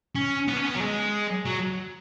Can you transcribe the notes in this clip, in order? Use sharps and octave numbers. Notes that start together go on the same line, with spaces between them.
C#4
B3
C#4
B3
F#3
G#3
F#3